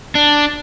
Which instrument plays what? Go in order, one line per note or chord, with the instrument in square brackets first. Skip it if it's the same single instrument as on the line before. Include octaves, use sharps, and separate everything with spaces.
[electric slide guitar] D4